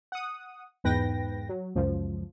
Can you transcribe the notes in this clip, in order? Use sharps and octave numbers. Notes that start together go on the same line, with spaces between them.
F#5 D#6
E2 G#2 B4 G5 A#6
F#3
C#2 F#2 F3